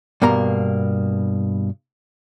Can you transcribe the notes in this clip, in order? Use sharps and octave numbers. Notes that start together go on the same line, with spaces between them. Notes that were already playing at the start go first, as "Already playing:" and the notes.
G2 B2 A#3 A#5